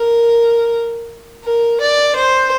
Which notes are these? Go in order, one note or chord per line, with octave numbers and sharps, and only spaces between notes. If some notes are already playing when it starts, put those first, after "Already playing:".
Already playing: A#4
A#4
D5
C5